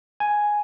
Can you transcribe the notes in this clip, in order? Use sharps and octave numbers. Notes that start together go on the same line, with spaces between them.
G#5